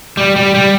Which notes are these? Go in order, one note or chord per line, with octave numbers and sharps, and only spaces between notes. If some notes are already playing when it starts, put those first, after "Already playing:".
G3
G3
G3